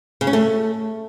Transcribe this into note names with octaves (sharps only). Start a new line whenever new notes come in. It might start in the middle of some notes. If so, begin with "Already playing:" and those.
C#3
C#4
A3